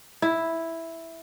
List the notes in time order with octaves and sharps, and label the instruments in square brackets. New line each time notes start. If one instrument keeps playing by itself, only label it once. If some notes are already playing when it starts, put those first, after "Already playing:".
[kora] E4